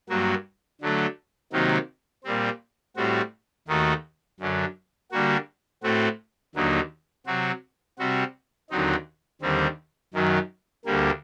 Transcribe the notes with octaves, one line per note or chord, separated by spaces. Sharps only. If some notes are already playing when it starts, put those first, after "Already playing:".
G2 F#3 A#3 F#4
D3 F#3 A3
C3 D#3 F#3 A#3 D#4
A#2 G3 C4
A2 G3 C4 F#4
D#2 D#3 A3 D#4 F#4
F#2 D3 F#3
D3 G3 A#3 F#4
A2 A3 C4 F#4
D#2 D3 F#3 A#3 D#4
C3 F#3 C4 F#4
C3 G3 C4 F#4
D#2 D3 F#3 C4 D#4
D#2 D3 G3 C4
F#2 D#3 F#3
D2 D3 G3 A#3